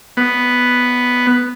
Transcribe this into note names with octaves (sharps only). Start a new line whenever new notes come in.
B3